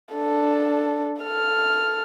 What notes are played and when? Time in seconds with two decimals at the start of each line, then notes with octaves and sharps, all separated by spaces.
0.14 D4 A4
1.21 A4 F6